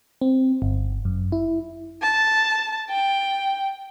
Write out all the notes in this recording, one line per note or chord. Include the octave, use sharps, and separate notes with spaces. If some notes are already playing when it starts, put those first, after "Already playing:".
C4
G1
F#2
E4
A5
G5